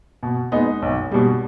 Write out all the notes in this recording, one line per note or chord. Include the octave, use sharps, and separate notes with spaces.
B2
G#3 B3 D#4
B1
B2 G3